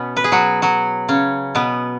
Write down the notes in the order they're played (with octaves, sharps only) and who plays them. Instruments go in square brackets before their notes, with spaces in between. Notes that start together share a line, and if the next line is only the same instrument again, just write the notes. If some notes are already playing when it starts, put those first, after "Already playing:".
Already playing: [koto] B2 B3 C#4
B4
G#4
F#3 F#4
F#3 F#4
C#3 C#4
B2 B3